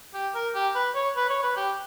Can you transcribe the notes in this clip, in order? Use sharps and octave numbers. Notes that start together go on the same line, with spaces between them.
G4
A#4
G4
B4
C#5
B4
C#5
B4
G4